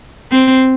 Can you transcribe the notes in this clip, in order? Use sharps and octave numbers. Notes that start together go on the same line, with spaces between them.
C4